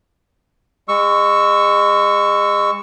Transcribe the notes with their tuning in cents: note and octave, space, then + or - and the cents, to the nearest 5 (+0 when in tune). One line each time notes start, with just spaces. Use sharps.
G#3 -30 C#6 +0 E6 +0